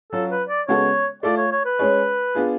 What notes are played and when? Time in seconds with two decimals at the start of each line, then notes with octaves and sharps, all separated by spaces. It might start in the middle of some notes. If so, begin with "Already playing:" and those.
0.12 F#3 C#4 F4 A4
0.31 B4
0.49 D5
0.68 C#3 G#3 B3 F#4 A4 C#5
1.23 A3 F4 A4 D5
1.37 C#5
1.51 C#5
1.65 B4
1.79 G#3 C#4 G#4 C#5
2.35 B3 D4 F4 G#4